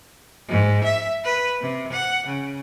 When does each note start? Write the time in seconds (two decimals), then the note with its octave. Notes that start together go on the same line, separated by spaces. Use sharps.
0.49 G#2
0.84 E5
1.24 B4
1.61 C3
1.92 F#5
2.26 C#3